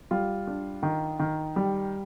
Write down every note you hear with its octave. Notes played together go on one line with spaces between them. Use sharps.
G3 F4
D4
D#3
D#3
G3